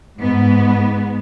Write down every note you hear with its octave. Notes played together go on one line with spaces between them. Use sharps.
G#2 B3